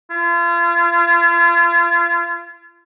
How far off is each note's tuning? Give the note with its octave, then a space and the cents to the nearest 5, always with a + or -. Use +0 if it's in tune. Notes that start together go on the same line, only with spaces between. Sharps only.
F4 -35